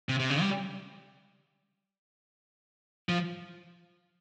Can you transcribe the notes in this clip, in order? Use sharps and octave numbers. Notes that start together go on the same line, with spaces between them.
C3
C3
C#3
G3
F3